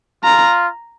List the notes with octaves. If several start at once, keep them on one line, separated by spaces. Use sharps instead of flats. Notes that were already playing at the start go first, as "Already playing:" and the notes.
F4 A#5